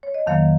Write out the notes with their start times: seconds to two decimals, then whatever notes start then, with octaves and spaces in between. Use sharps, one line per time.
0.03 C#5
0.14 D#5
0.26 F2 D#3 F#3 A#3 F5